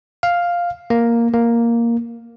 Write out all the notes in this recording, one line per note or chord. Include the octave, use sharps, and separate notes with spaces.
F5
A#3
A#3